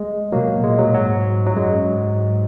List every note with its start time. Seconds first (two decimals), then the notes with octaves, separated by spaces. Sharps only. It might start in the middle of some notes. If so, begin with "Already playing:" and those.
Already playing: G#3
0.32 B2 F#3 A#3
0.63 A#2 G#3
0.79 F#3
0.94 G#2 F#3
1.47 F#3
1.56 F#2 G#3
1.88 G#2